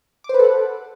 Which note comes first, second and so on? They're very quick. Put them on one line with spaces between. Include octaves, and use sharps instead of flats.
D6 C5 B4 A4 F#5